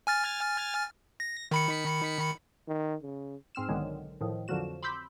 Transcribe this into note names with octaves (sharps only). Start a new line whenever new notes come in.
G#5 F6 A6
A#6
D#3 B5 C#7
D#3
C#3
G#2 C4 F6 E7
B1 D3 D#3 F#3 G#3
A2 D#3 F3
F2 D3 F3 F#3 F#4 E7
B5 C6 D6 E6 G6 B6